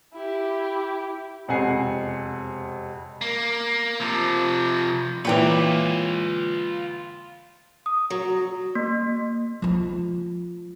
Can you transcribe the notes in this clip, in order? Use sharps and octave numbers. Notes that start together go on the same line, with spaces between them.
E4 G4
E1 F2 C3 F#5 G#5 C7
A#3
C3 F3
A#2 E3 F4 B4 C#5 G5 D6
D#6
F#3
A#3
F3 F4